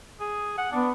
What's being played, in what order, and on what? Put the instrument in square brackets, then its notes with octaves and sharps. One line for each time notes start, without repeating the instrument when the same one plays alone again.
[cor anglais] G#4
F#5
[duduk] B3 [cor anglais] D4